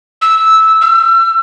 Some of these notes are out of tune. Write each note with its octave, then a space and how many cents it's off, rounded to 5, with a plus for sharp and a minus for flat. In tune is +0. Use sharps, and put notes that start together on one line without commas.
E6 -15
E6 +35